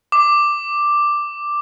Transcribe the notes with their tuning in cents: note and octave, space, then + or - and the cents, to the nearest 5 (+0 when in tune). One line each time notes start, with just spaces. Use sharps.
D6 +5